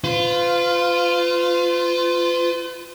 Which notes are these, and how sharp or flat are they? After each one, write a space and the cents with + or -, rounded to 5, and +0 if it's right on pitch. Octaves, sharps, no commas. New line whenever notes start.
F4 -5 B4 +45